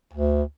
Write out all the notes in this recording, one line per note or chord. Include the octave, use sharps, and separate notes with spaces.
D2